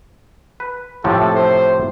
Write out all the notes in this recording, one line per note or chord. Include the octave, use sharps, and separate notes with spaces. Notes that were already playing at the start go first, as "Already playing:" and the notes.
B4
A2 C3 F3 A4
C5